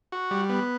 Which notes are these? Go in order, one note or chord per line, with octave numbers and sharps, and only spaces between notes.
F#4
G3
B3